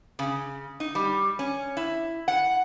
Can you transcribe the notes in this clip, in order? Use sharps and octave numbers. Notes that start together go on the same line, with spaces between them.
C#3
D#4
G3
C#4
E4
F#5